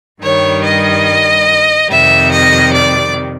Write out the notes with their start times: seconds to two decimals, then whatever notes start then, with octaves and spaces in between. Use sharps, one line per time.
0.21 G2 D#3 G3 C#5
0.63 D#5
1.88 F2 C3 D#3 G3 E5
2.31 D#5
2.72 D5